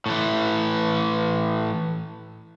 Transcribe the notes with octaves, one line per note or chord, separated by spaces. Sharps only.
A2 E3